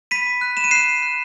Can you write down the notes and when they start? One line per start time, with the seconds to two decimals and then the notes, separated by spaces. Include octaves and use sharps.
0.11 B5 B6 D#7
0.26 B5
0.41 F#6
0.57 B5 E7
0.64 D#7
0.71 F#6 C7 E7
0.87 F#6
1.03 F#6